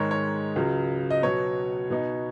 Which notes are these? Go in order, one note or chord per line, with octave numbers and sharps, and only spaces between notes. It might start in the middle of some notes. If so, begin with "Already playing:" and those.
Already playing: G#2 D#3 G#3 D#4 C#5
C#5
C#2 C#3 F#3
D#5
B2 F#3 B3 C#5
B2 B3 D#4